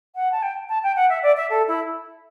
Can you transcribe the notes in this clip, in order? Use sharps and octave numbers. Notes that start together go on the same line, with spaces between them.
F#5
A5
G5
A5
G5
F#5
E5
D5
E5
A4
E4